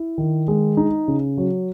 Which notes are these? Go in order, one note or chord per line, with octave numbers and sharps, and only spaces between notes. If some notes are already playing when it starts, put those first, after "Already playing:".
Already playing: E4
D#3
G#3
D#4
C#3
F#3